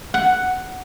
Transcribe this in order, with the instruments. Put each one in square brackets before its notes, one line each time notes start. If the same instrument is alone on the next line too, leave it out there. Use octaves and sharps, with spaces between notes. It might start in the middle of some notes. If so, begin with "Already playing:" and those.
[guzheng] F#5